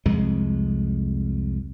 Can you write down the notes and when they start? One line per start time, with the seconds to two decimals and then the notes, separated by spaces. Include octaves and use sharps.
0.06 C2 F2 G#3